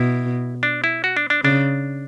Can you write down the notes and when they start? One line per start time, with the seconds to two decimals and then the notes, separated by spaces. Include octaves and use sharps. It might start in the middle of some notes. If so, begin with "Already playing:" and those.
Already playing: B2 E4
0.63 D4
0.84 E4
1.04 F#4
1.17 D4
1.30 D4
1.44 C#3 D4